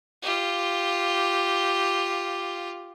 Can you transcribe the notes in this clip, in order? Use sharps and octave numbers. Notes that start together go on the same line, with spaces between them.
F4 G4